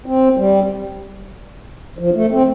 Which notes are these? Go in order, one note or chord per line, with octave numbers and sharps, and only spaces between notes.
C4
G3
F3
A3
C4